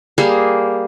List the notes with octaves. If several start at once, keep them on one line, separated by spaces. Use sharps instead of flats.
G3 A#3 G#4